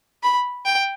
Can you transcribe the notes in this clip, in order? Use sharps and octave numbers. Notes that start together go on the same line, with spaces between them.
B5
G5